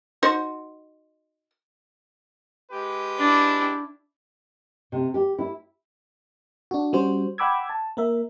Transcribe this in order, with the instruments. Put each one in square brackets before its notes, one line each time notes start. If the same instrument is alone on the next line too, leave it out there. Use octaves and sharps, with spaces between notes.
[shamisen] D#4 F#4 C5
[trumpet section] G#3 G4 B4
[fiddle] D4 E4
[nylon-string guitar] C3
G4
E4
[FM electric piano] D4 F#4
G3 C#4 F#4 C5
F#5 G5 B5 D6 E6 G#6
A5
A#3 A#4 E5